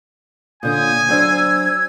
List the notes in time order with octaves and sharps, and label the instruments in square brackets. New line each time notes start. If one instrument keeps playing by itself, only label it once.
[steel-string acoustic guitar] A#2 D3 C#4 [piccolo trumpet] G#5 [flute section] D#6 G6
[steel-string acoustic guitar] F#3 D4 C5 [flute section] E6 G#6